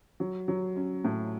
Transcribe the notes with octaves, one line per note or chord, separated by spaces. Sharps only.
F#3
F#3
C#4
A2